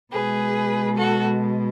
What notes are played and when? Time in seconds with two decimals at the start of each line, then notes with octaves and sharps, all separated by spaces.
0.13 B2 G#3 G#4 B4
0.97 F#4 A4